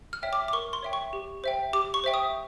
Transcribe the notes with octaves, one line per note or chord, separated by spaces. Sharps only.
F6
C#5 E5 G5
D6
D6
A#4 C#6
C6
C#5 E5 G5
C#6
G4
C5 E5 G5
G4 D6
C#6
C5 E5 G5
D#6